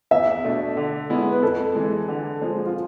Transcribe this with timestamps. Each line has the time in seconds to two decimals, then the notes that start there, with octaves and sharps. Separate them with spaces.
0.11 E2 E5
0.44 B2 A3 D4 A4
0.77 D3
1.10 G#3 B3 E4
1.31 B4
1.42 F2 A4
1.75 E3 G#3
2.08 D3
2.41 F3 G#3 C4
2.66 F4